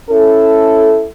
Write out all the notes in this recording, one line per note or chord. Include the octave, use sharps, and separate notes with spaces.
C#4 E4 A4